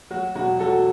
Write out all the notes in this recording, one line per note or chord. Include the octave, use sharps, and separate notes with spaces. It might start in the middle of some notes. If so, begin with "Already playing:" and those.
F#3 F#4
E1 F#4
F#3 F#4 A4